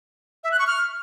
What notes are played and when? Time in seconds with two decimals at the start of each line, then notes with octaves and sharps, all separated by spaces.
0.44 E5
0.52 F#6
0.59 C#6
0.67 F6